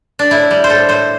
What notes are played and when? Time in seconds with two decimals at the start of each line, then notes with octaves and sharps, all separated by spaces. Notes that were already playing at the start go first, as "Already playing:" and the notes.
0.19 D4
0.31 A2 E4
0.51 G3
0.64 C5
0.70 A2 A4
0.89 A2 C5